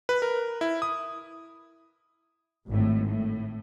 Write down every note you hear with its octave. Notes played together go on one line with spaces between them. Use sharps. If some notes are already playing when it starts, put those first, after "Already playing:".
B4
A#4
E4
D#6
G#1 A2
A2